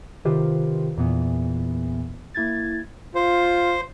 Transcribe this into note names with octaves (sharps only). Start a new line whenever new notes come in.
C3 D#3 F4 G4 B4 C5
E2 A#2 E3 B3
A#3 E4 G#6 A6
F4 C5